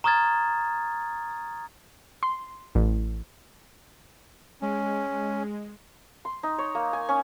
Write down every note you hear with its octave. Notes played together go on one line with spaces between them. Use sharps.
A#5 C#6 D#6 F6 G#6 A6
C6
A1
G#3 C#4
C6
D#4
C#5
A#3
G#5
C#4